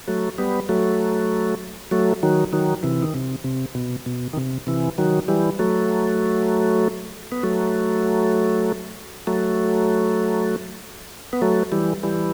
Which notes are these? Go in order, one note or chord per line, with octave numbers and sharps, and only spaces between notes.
F#3 A3
G3 B3
F#3 A3
F#3 A3
D#3 F#3
D#3 F#3
C3 E3
D#3
C3
C3
B2
B2
D#3
C3
C3 E3
D#3 F#3
E3 G3
F#3 A3
B3
F#3 A3
F#3 A3
B3
F#3 A3
E3 G3
E3 G3